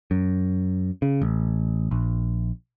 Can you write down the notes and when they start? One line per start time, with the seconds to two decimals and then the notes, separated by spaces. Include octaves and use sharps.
0.11 F#2
1.02 C#3
1.22 A1
1.91 A#1